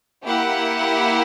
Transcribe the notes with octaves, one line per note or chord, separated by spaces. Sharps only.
A#3 E4 G4 F#5